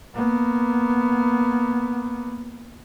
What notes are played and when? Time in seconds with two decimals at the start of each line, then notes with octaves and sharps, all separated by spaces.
0.15 A#3 B3